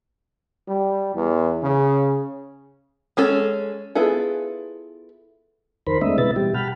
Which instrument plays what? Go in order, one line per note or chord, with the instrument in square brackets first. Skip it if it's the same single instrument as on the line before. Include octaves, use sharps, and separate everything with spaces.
[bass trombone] G3
E2
C#3
[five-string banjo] G#3 C#4 A4
B3 E4 F4 G#4 A4
[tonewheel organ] F2 D#3 A#4 C5 B5
G#3 A3 C4 D4 D#5 E5
B2 E3 B4 E5 A6
B2 G3 G4
F#5 G5 A5 B5 F6